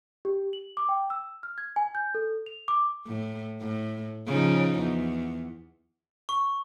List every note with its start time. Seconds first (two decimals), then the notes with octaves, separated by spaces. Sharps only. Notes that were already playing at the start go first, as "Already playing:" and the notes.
0.25 G4
0.53 F#7
0.77 D6
0.89 G5
1.10 E6
1.43 F6
1.58 G#6
1.76 G#5
1.95 G6
2.15 A4
2.46 F7
2.68 D6
3.07 A2
3.61 A2
4.27 C#3 F3 D#4
4.80 E2
6.29 C#6